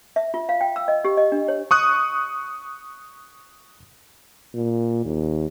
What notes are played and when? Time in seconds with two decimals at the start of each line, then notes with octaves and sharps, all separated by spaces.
0.16 E5
0.34 F4
0.49 F5
0.61 G5
0.76 E6
0.88 D#5
1.05 G4
1.17 D#5
1.32 D4
1.48 C#5
1.71 C#6 D#6 F#6
4.55 A#2
5.05 D#2